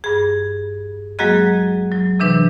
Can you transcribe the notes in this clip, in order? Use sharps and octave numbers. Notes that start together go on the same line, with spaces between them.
G2 G#4
F#3 G#3 A#3 F#4 G#4 D#5
F#3
C3 E3 D4 B4